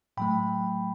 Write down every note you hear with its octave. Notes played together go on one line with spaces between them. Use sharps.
A2 F#3 A3 G5 B5